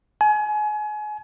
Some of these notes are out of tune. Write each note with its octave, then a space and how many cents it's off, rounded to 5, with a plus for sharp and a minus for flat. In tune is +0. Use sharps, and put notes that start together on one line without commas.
G#5 +30